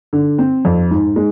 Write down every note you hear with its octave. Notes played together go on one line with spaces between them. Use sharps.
D3
C4
F2
G#2
G#3